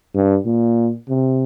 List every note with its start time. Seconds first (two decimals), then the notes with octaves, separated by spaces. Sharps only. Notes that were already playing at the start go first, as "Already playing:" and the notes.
0.15 G2
0.45 A#2
1.09 C3